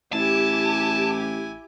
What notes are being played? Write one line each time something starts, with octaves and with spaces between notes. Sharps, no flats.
A1 E4 G4 G#5 A5 D6